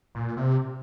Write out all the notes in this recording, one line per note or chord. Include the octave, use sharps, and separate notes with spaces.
A#2
C3